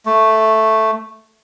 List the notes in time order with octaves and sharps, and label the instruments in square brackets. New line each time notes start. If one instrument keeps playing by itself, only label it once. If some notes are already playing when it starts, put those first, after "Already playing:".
[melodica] A3